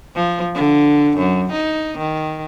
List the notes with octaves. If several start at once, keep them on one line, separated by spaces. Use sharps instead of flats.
F3
D3
F#2
D#4
D#3